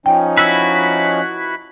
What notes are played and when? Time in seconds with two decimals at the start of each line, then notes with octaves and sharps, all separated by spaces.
0.06 F3 C#4 D#4 G5
0.38 E4 F#4 B4 E6